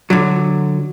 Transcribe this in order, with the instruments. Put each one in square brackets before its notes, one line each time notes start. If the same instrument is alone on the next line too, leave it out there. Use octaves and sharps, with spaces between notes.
[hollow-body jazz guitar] D3 F#3